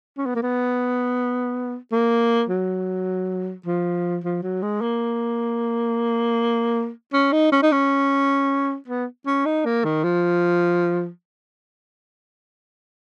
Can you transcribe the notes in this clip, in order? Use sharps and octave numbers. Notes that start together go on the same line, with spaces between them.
C#4
B3
A#3
B3
A#3
F#3
F3
F3
F#3
G#3
A#3
C#4
D#4
C#4
D#4
C#4
B3
C#4
D#4
A#3
D#3
F3